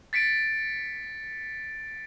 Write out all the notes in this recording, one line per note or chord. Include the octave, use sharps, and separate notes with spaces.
A6 B6 C#7 D7